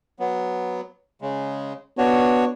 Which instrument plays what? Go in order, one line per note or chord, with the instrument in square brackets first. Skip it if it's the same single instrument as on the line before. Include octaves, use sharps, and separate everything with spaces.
[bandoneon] F#3 B3
C#3 G#3
[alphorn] B3 [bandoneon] D4 F#4 C#5